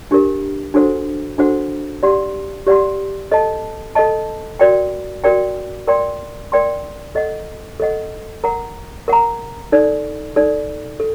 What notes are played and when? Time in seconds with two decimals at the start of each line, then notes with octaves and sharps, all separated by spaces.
0.11 D4 G4 A#4
0.74 D4 F#4 A4 C5 F#5
1.38 D4 F#4 A4 C5 F#5
2.03 G4 D5 F#5 C6
2.67 G4 D5 F#5 C6
3.32 A4 D#5 A5
3.95 A4 D#5 A5
4.59 F#4 A#4 D5 G5
5.24 F#4 A#4 D5 G5
5.87 A#4 D5 G5 C6
6.52 A#4 D5 G5 C6
7.15 A4 D#5 F#5
7.80 A4 D#5 F#5
8.44 A#4 F#5 A#5
9.08 A#4 F#5 A#5
9.72 D#4 A4 D5
10.36 D#4 A4 D5
11.00 A4